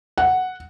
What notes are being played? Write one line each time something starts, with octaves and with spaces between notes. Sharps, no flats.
F#5